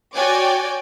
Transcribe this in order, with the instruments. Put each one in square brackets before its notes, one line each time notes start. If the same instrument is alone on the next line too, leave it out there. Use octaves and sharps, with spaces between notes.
[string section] F#4 C#5 D5 G5 G#5 D6